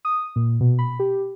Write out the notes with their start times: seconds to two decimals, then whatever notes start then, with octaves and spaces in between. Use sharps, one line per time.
0.05 D#6
0.36 A#2
0.61 B2
0.79 B5
1.00 G4